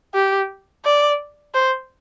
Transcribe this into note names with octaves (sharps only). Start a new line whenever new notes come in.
G4
D5
C5